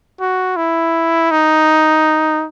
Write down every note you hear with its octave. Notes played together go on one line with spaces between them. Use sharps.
F#4
E4
D#4